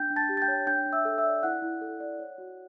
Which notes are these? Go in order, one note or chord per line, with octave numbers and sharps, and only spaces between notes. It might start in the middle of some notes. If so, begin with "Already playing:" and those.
Already playing: D4 G5 G6
D4
A5 A6
G4
A6
G5 G6
C#5
D4 G5 G6
D4
E5 E6
A4
E5 E6
D5
E4 F#5 F#6
E4
A4
D5
C#5
F#4